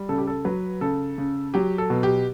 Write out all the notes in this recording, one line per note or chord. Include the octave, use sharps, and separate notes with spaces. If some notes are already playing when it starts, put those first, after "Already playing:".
Already playing: G3
C#3 A4
G4
A4
F#3 B4
C#3 A4
C#3
F#3 G4
A4
B2
G4